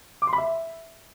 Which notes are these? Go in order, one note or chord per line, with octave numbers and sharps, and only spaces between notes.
D6
C6
B5
E5